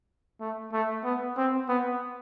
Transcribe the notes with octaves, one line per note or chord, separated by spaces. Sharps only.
A3
A3
B3
C4
B3